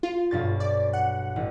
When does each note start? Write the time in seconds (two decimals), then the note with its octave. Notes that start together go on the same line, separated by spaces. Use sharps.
0.03 F4
0.31 B1 G2 A6
0.60 D5
0.93 F#5
1.36 A1